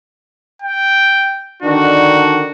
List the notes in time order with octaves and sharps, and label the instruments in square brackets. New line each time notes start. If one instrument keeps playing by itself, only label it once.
[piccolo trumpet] G5
[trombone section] D3 D#3 D4 [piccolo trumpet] F#4